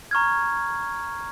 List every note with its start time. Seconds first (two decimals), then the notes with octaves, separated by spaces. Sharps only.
0.11 A#5 C#6 F6 G#6